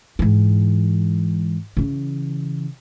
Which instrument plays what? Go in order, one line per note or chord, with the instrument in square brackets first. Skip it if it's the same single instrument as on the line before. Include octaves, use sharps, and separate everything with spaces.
[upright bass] G#2 E3
C#3 E3